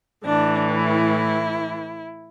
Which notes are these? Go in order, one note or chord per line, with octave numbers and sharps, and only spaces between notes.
A2 E3 D4
E4